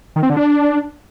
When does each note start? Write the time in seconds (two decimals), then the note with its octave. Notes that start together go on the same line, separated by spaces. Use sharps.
0.16 D#3
0.23 C4
0.30 D3
0.37 D4